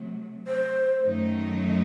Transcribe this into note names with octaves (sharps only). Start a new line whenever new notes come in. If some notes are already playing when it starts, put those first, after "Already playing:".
Already playing: C3 F#3 A3
C5
F#2 D#3 F#3 A3 D#4